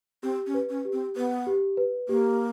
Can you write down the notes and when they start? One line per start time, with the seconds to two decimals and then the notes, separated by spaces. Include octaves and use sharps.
0.23 C4 G4
0.46 C#4
0.54 B4
0.69 C#4
0.85 G4
0.93 C4
1.16 B3 B4
1.47 G4
1.77 B4
2.09 A#3 G4